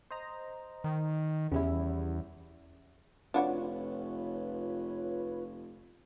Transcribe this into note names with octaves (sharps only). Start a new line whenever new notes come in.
C5 D#5 A#5
D#3
E2 C#3 G3 E4
F1 D4 F4 F#4 B4 C#5